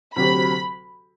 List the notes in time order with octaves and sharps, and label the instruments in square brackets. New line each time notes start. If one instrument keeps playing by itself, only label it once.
[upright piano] D2 C3 F#3 C4 G4 [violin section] B5